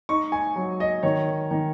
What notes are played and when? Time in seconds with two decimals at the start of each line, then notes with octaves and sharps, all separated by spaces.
0.09 D#4 C#6
0.32 G#5
0.56 F#3
0.80 D#5
1.03 D#3 C#5
1.51 D#3